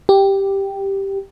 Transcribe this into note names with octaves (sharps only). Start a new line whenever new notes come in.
G4